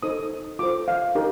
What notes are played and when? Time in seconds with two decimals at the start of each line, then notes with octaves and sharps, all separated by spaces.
0.03 D#4 A4 C5 D#6
0.59 F4 A4 C5 D6
0.88 F5
1.15 D#4 G4 A#4